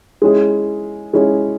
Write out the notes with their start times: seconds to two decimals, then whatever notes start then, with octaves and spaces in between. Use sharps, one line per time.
0.22 G#3 C#4 E4 G#4
1.13 G#3 C#4 E4 G#4